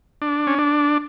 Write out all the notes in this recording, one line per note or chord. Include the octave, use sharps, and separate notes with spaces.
D4
C#4
D4